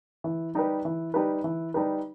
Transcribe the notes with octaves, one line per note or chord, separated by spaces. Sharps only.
E3
G3 D#4 G4 B4
E3
G3 D#4 G4 B4
E3
G3 D#4 G4 B4